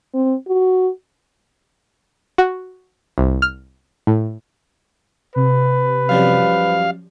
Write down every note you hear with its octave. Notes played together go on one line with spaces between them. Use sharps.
C4
F#4
F#4
C2
F6
A2
C3 B4
F#2 F3 G3 F5